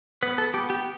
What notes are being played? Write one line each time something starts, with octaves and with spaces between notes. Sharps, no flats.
B3 B4
A4
B3 G4
G4